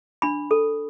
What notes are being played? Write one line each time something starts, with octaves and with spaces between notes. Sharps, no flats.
D4 B5
A4